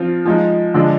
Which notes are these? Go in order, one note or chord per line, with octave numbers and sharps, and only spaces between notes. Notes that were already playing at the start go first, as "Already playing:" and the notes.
Already playing: F3 C4 F4
F3 G#3 D#4
D3 F3 G#3 D4